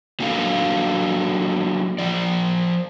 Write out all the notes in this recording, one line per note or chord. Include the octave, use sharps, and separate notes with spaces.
F#3 A#3 D4 A4 F5
F3 D5